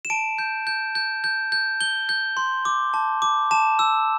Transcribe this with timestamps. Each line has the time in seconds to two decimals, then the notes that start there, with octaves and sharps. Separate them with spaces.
0.05 E7
0.10 A5 D7
0.39 G6
0.67 G6
0.95 G6
1.24 G6
1.52 G6
1.80 G6 G7
2.09 G6
2.37 C6
2.65 D6
2.94 A5
3.22 D6
3.51 A5 E7
3.79 E6